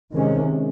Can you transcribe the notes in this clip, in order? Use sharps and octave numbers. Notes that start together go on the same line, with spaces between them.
C3 D#3 G#3 C#4